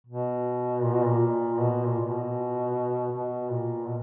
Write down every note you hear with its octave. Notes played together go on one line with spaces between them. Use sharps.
B2
A#2
B2
A#2
B2
A#2
A#2
B2
B2
A#2
B2